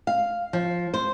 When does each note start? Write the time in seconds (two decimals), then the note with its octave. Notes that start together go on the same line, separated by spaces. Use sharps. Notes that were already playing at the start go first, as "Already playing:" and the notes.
0.07 F5
0.53 F3
0.94 C5